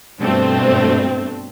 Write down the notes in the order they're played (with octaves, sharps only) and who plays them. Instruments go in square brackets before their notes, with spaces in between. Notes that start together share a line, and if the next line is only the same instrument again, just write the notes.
[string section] G2 B2 A3 C4 D4